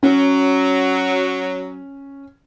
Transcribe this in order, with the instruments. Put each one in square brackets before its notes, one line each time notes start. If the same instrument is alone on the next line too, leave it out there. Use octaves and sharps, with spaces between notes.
[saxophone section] F#3 [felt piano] C#4